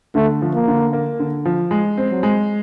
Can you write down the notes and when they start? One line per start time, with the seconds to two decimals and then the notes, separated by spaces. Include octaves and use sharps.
0.15 D3 A3
0.42 F3
0.54 A#3
0.68 D3
0.93 A#3
1.20 D3
1.45 F3
1.71 G#3
1.98 C4
2.10 F#3
2.23 G#3